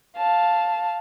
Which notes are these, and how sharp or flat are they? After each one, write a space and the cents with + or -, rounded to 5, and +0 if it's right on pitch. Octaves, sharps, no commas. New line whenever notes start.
F5 +0 A5 +0